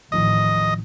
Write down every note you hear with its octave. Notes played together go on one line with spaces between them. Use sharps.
A1 D#2 D#3 F3 D#5